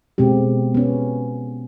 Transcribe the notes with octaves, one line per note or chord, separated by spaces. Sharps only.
B2 G#3 C4 G4
B3 C#4